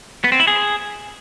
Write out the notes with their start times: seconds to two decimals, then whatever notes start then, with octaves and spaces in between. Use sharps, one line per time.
0.24 B3
0.32 C4
0.40 E4
0.47 G#4